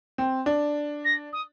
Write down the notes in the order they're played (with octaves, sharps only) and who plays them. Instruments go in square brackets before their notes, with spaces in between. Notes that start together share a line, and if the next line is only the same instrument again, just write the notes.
[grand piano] C4
D4
[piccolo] A#6
D#6